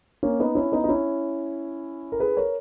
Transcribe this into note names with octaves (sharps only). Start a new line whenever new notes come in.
A#3 C#4
B3 D#4
C#4 E4
B3 D#4
D#4
C#4 E4
A#4
G#4 B4
A#4 C#5